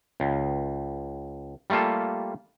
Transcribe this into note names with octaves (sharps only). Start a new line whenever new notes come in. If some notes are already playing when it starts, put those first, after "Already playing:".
C#2
G3 A3 A#3 F4 A4